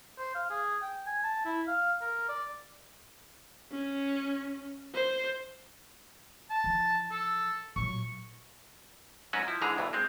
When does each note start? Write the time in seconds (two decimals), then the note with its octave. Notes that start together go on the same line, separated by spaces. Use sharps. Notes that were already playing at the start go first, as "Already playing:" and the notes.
0.18 C5
0.35 F5
0.50 G#4
0.82 G5
1.06 G#5
1.24 A5
1.45 E4
1.67 F5
2.01 A#4
2.28 D5
3.72 C#4
4.94 C5
6.50 A5
6.64 E3 F3
7.11 A4
7.76 A#2 F#3 C#6
9.33 G#2 F#3 C#4 F#4 B4
9.47 F3 E4
9.61 G#2 D3 E3 G#3 G#4 A#5
9.77 D2 G2 B2 E3
9.93 G#3 C4